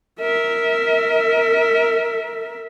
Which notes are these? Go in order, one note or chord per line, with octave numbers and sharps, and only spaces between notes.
A#4 E5